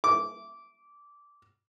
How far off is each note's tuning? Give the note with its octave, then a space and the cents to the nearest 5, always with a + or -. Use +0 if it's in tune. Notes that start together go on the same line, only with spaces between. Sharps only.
D6 -15